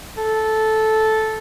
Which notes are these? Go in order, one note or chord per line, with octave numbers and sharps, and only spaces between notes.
A4